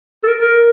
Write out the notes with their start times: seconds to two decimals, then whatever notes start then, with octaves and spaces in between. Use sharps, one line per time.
0.23 A4
0.27 A#4
0.41 A#4